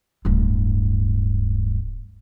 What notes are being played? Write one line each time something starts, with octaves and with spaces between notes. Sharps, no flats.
D1 G2